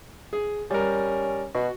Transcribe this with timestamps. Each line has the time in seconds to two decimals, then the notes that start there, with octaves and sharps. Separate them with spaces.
0.33 G#4
0.71 G3 C#4 A#4
1.55 B2 F#4